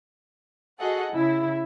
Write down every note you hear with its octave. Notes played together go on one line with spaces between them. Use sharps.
F#4 G#4 A4 D#5 F#5
C#3 E4